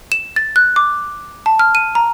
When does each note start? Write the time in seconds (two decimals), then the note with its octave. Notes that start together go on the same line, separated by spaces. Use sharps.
0.12 E7
0.36 A6
0.56 F#6
0.76 D6
1.46 A5
1.59 F6
1.75 D#7
1.95 A#5